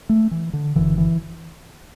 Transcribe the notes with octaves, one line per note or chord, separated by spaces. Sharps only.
A3
E3
D3
F#1 F#2 D3 E3
E3